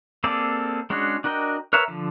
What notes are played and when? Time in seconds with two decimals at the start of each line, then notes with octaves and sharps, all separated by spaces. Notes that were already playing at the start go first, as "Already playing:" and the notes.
0.24 A#3 C4 G#4 A4 D5
0.90 G#3 C#4 D4 F#4 G#4
1.24 D4 F#4 A#4 D#5 G5
1.73 A#4 B4 C#5 E5 A#5
1.88 D3 F3